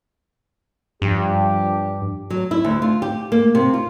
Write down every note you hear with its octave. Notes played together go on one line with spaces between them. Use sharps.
G2 F3 D4 G4
F#3
E4
D2
F4
G4
A#3
C3
F4